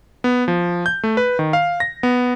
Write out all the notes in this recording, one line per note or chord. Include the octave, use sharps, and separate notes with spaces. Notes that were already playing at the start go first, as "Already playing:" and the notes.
B3
F3
G6
A3
B4
D#3
F5
A#6
B3